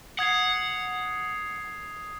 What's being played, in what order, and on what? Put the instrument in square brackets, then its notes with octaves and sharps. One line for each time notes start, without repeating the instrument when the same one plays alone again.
[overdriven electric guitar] F#5 [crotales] D#6 G#6 C7